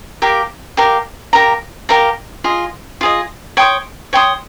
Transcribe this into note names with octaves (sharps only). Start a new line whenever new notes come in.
G4 A#4 F5
G4 A#4 F5
G4 A#4 F5 A#5
G4 A#4 F5 A#5
F4 G#4 D#5
F4 G#4 D#5
C#5 G5 C6 D#6
C#5 G5 C6 D#6